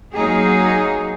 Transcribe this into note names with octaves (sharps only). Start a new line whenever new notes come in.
F#3 A#3 D#4 G#4